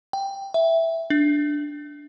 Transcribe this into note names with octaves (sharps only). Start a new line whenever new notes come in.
G5
E5
D4